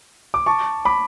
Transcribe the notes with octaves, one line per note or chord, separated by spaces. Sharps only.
D6
A5 C#6
B5 D6